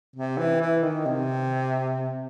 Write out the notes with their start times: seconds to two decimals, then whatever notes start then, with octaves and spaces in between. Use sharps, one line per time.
0.16 C3
0.38 E3
0.61 E3
0.83 D#3
1.06 C3